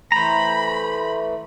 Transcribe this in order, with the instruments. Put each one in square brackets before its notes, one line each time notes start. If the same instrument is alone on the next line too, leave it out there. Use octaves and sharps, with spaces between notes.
[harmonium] E3 A3 [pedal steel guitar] C5 A#5 [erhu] B5